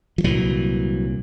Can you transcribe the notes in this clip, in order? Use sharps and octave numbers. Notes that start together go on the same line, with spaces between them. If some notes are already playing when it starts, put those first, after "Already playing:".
F3
C2 A#2 E3 F#3